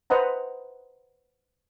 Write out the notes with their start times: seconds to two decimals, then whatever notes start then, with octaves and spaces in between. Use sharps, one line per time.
0.10 B4 C5 D#5 F#5 A#5